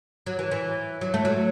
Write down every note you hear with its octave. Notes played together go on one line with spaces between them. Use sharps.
F#3
E3
E3
F#3
A3
F#3